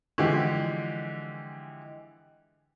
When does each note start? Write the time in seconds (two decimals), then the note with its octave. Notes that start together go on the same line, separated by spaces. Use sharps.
0.18 D3 E3 F3 G#3 G4